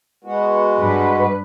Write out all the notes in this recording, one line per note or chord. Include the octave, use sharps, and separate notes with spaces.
G#3 B3 F#4
G2 B4